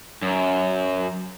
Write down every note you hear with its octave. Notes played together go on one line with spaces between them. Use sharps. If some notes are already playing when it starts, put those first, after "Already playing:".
F#2